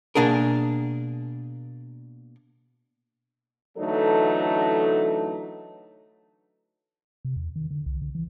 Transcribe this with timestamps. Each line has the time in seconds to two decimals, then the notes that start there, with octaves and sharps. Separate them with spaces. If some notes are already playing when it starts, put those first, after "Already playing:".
0.15 B2 A#3 D4 G#4 A#4
3.78 D3 E3 F#3 A3 D#4 A4
7.25 C3
7.36 E2
7.56 D#3
7.71 D3
7.86 C2
8.02 D3
8.15 E3